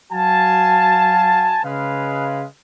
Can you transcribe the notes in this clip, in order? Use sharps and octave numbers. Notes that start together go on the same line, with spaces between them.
F#3 F#4 F5 G#5 A5
C#3 G#3 B4 F5